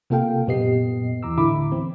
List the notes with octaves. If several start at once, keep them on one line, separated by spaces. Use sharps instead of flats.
C3 A#3 F4 A4 F5 G5
F#2 A#2 B3 G4 D#5 C7
D#2 E3 A#5 D6 E6
A2 D3 E4 B5 D6
E3 C4